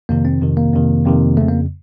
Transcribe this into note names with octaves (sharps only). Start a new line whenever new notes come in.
F2 C3 D#3 A#3
C4
F2 C3 D#3
A#3
F2 C3 D#3
F2 C3 D#3
F2 C#3 A3
A#3